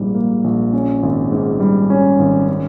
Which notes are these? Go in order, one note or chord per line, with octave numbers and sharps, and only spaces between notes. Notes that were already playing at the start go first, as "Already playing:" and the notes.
Already playing: A#1 G#2 G3 A#3
A#3
A#1
C#4
G#1
G#2
G3
C#4
G#1
C#4